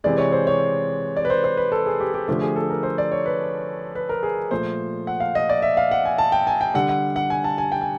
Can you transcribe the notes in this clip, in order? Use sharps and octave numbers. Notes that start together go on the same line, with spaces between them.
C3 E3 G#3 D5
C#5
C5
C#5
D5
B4
C5
C5
B4
A4
G#4
G4
G4
D3 F3 A3 G4
G#4
A4
A#4
C5
D5
C#5
B4
B4
A#4
G#4
A#2 F3 A3 C5
F#5
F5
D#5
D5
E5
F5
F#5
G#5
A5
G5
G#5
G5
D3 G3 F#5
F#5
F#5
G#5
A5
G#5
G5
G#5